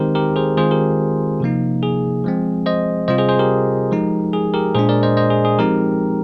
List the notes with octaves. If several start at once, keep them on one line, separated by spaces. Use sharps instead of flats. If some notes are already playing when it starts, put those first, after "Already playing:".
Already playing: D#3 G#3 C4 D#4 G4 A#4 C5
G4 A#4
G#4 C5
D#3 G#3 C4 F4 G#4 C5
G4 A#4
C3 F3 A#3 D#4
G#4
F3 G#3 C4
C5 D#5
C3 G3 C4 F4 C5 D#5
G#4 C5
G#4 C5
G4 A#4
F3 G#3 D#4
G#4
G4 A#4
A#2 G#3 D4 G#4 C5
A#4 D5
C5 D#5
C5 D#5
G#4
G#4
F3 G#3 C4 D#4 G4 A#4